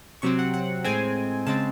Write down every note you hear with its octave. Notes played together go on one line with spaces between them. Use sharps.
C3 F#3 C4 C#6
F#5
F#5
A2 G#3 C4 G#5
C#3 G#3 C4 A5